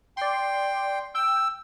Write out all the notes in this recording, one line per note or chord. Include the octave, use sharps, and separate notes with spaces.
D5 G5 C6
G5 E6